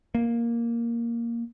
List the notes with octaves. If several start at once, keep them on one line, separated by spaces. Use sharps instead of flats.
A#3